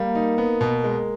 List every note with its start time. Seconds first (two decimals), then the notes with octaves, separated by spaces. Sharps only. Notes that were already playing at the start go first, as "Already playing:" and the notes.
Already playing: G3 A#3
0.15 D#4
0.38 B3
0.61 B2
0.84 G#3